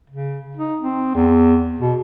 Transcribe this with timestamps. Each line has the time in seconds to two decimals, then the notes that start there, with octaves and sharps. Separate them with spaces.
0.10 C#3
0.57 D#4
0.80 C4
1.15 E2
1.80 B2